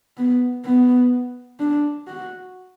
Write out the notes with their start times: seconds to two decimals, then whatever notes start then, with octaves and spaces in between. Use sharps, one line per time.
0.17 B3
0.65 B3
1.60 D4
2.07 F#4